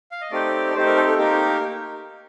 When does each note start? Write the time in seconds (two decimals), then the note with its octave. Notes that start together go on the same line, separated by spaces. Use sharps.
0.12 F5
0.21 D#5
0.31 A3 C4 D#4 G4 D5
0.74 A3 C4 D#4 G4 C5
0.86 A#4
0.96 A4
1.07 A4
1.18 A#3 D#4 G4 A#4